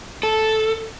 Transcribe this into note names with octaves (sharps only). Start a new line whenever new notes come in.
A4